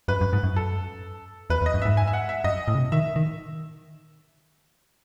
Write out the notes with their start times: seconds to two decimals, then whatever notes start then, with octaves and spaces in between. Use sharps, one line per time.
0.08 F#2 B4
0.21 F#2
0.33 G#2
0.43 F#2
0.56 A4
1.50 E2 B4
1.61 E2
1.66 D#5
1.74 F#2
1.82 G#2 E5
1.97 G#5
2.07 E5
2.13 F#5
2.29 E5
2.44 F#2 D#5
2.68 A2
2.75 C#3
2.80 B2
2.92 D#3 E5
3.16 D#3